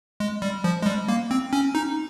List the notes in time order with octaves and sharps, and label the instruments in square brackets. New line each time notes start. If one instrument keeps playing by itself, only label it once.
[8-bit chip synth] G#3
G3
F3
G#3
G3
A#3
C4
C#4
D#4